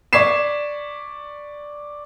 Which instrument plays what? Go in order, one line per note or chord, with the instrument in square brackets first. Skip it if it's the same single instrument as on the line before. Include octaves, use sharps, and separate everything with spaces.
[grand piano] D5 C#6 G#6 B6 C7 E7